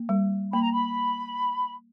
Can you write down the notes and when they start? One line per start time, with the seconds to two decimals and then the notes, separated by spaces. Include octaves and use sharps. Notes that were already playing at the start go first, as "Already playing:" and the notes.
Already playing: A#3
0.09 G3
0.53 A#3 B5
0.62 A#5
0.72 B5